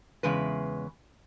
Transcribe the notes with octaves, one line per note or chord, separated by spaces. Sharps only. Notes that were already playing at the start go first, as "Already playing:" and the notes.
E2 C#3 G#3 B4